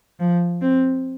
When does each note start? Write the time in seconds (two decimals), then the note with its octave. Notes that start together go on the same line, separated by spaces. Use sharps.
0.20 F3
0.62 C4